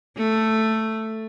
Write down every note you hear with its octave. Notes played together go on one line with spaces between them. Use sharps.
A3